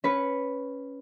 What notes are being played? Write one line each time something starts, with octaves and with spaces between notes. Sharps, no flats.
C#4 B4 C#7